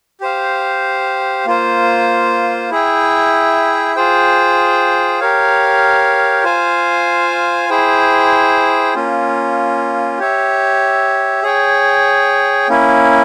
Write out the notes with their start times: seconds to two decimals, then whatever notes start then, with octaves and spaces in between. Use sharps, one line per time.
0.21 G4 C5 F5
1.46 A#3 F4 C5
2.70 E4 G#4 E5 G5
3.96 F4 G#4 C5 G5
5.20 G4 A#4 C#5 F5
6.44 F4 C5 F5 G#5
7.69 E4 G#4 C5 G5
8.95 A#3 C#4 F4
10.18 G4 C#5 E5
11.43 G#4 C#5 G5
12.69 A#3 C#4 E4